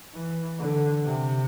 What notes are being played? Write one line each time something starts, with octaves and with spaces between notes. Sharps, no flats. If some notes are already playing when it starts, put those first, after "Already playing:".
E3
D3
C3